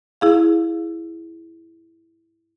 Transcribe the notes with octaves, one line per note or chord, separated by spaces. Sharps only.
E4 G#4 F5